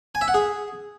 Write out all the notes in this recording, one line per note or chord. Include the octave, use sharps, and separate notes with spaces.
G#5
E5
F#5
G#4